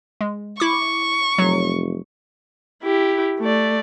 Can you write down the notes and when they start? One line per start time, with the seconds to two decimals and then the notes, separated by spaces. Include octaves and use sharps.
0.21 G#3
0.60 E4 C#6 D6
1.38 F1 F#3
2.83 E4 G4
3.40 A3 D5